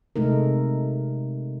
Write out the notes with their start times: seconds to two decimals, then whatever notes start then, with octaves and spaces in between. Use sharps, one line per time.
0.16 C3 G#3 A3 D#4 A#4